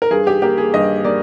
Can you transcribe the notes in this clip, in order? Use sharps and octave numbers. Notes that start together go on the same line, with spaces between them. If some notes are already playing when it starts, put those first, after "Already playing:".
A#4
G2 G#4
G4
A#3 G4
G#4
G2 D#5
A#3 D5